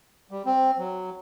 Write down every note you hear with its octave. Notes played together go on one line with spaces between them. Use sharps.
G3
C4
F#3